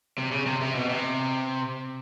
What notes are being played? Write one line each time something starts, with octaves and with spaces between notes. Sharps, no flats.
C3
C#3
C3
C3
B2
C3